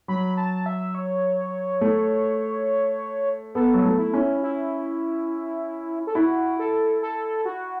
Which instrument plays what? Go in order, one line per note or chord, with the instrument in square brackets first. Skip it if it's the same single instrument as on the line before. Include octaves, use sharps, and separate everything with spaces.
[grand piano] F#3 [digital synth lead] B5
[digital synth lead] A5
E5
C#5
[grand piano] A3
[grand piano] B3 [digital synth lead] A4
[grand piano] F#3
A3
[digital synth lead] E4
[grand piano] C#4
[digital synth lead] E4
A4
[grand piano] E4 [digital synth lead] F#4
[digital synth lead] A4
A4
F#4